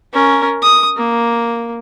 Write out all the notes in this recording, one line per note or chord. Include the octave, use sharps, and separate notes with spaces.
C#4 A#4
D#6
A#3